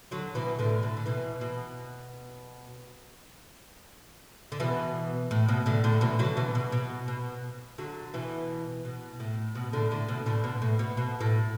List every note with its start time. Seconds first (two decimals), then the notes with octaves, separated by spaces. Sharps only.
0.11 D3 F#3
0.35 B2 E3
0.59 A2 D3
0.83 B2
0.97 D3
1.06 B2 E3
1.41 B2
4.52 D3
4.60 B2 E3
5.31 A2
5.48 B2
5.66 A2 D3
5.84 A2 D3
6.01 B2 E3
6.19 D3 F#3
6.37 B2 E3
6.55 B2
6.72 B2
7.08 B2
7.78 D3 F#3
8.14 B2 E3
8.85 B2
9.20 A2
9.55 B2
9.73 A2 D3
9.91 A2 D3
10.09 B2
10.26 A2 D3
10.44 B2
10.62 A2
10.79 B2
10.97 B2
11.21 A2